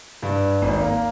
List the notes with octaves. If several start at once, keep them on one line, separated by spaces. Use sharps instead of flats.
G2
G#1
A#3